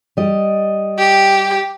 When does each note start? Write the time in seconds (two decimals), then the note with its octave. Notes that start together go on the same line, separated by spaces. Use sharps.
0.17 G3 D#5
0.98 G4